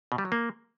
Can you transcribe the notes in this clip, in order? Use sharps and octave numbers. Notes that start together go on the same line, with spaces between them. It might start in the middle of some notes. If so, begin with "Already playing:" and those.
B2
G3
F#3
A#3